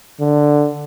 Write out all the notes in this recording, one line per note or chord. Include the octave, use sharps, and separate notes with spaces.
D3